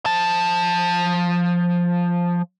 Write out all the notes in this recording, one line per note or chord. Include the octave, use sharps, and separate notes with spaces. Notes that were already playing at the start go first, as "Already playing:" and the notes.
F3 A5